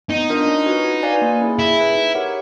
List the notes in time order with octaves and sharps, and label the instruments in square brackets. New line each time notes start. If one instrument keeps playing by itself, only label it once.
[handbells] B3 [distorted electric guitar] D#4
[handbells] D4 F4 A#4 D#5
C#4
F#4 B4
F#4
B4 D5 F5 G#5
A#3
C#4 E4 G#4
[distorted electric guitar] E4 [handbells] G#4
[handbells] B4 E5
D#4
G4 A#4 C#5 F#5